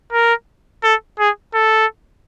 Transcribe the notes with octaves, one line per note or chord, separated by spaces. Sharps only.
A#4
A4
G#4
A4